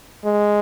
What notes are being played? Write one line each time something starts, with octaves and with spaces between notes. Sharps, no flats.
G#3